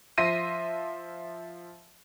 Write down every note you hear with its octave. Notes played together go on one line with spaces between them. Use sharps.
F3 E5 C6 A#6 C7 D#7